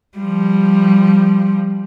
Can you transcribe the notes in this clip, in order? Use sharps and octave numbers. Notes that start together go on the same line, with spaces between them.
F3 G3